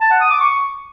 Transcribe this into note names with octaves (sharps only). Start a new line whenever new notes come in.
A5
F#5
D#6
D6
C#6